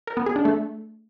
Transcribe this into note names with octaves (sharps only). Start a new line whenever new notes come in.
A#4
B3
G#4
D4
A3